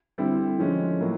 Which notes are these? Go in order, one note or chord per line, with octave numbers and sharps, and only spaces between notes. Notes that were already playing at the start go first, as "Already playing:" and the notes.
D3 G3 C4 E4
D3 F3 G#3 C#4
A2 F#3 A#3